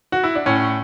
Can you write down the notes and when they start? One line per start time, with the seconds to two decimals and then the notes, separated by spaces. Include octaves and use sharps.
0.12 F#4
0.24 E4
0.35 D4
0.46 A2 C#4